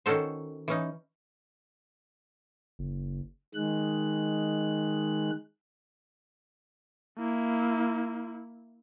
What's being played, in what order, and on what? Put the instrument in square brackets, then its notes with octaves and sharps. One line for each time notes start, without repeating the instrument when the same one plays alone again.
[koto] D#3 C#4 F#4 A4 C5
E3 C#4 D#4
[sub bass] F#1
[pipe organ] D#3 G#3 F#6
[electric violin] A#3 E4